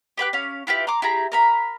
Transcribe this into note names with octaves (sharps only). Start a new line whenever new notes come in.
G4 B4 G5 F#6
C#4 F5
E4 F4 G4 B4
A#5 C6 D6
E4 G4 G#4 A#5
A#4 A#5 B5